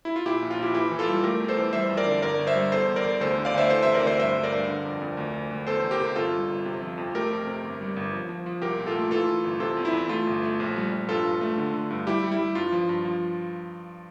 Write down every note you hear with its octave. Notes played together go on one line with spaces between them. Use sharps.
E4
F4
A#2 E4 G4
A#1
F4
A#1 E4 G4
E3 E4 G4
E3
F4 A4
G3
A3 G4 A#4
E2
A4 C5
E3
G3 C5 E5
F2
A#4 D5
D3
G1 A#4 D5
G1
C5 E5
G3
E2 A4 C5
E2
A#4 D5
E2
D2 A4 C5
D3
D5 F5
D2 C5 E5
E3 A4 C5
C5 E5
C3
A#4 D5
D2 C5 E5
G2 C5 E5
G2
A#4 D5
G2
D3
F2
F2
D2
D2
D2
E2 A4 C5
E2 C5
G4 A#4
C3
G1 F4 A4
G3
G1
C3
F3
F2
A3 G4 A#4
F2
C3
G1
G3
G1
F3
F3
F3
C2 G4 A#4
A#2
F4 A4
A3
E3 F4 A4
E3
G1
C3 F4 A4
E2
E4
E2
A3 F4
G1
A3
A#1
G3
A#1
G2 F4 A4
G2
A3
D3
D3
G2
G3 E4 G4
G3
E4
G3
G2 F4
F3
G2
F3